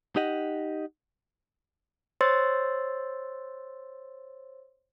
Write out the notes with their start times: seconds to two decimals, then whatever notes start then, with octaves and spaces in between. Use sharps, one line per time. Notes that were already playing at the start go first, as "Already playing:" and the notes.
0.16 D#4 G4 D#5 F#5
2.21 C5 C#5 C6 E6 A6